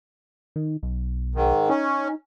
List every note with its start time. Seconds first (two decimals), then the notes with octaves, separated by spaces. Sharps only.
0.56 D#3
0.83 B1
1.35 G#2 D#3
1.69 C#4 D#4